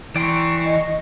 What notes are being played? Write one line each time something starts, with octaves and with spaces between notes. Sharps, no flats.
E3 D5 G5 A#5 C6 C#6
D#5